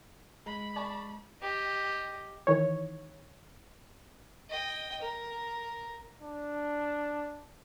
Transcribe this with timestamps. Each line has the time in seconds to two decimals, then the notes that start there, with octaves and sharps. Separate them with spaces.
0.46 G#3 B5
0.76 D5 A5 C#6
1.41 G4 D#5
2.47 D#3 E3 C#5
4.49 D#5 G5
5.02 A#4
6.21 D4